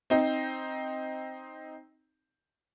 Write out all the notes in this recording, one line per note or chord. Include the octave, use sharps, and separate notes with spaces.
C4 D#4